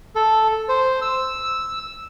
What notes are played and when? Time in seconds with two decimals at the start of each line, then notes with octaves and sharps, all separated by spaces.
0.15 A4
0.69 C5
1.02 E6